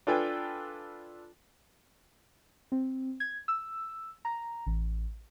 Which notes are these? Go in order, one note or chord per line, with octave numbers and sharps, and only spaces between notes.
D4 F4 A4 B4 G5 G#5
C4
G#6
E6
A#5
A1